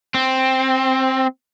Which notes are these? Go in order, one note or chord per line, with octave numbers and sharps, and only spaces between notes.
C4